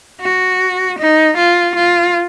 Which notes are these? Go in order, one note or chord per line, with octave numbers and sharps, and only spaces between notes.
F#4
D#4
F4
F4